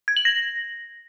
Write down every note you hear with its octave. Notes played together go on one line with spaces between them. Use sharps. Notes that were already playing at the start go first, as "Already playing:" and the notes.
G#6
F#7
A#6